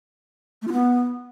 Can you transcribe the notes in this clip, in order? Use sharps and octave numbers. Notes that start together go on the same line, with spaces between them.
A3
F4
B3